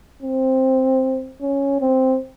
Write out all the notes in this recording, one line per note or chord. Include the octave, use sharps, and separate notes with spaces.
C4
C#4
C4